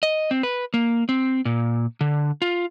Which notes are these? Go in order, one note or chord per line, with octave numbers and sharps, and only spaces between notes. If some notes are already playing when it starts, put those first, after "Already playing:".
D#5
C4
B4
A#3
C4
A#2
D3
F4